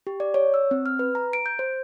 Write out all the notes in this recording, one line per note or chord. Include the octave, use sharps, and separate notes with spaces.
G4
D5
C#5
E6
C4
F6
B4
A#5
D7
G6
C5